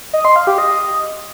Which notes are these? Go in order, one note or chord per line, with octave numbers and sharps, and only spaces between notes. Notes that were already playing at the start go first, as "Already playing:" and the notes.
D#5
C6
F5
G4
D#5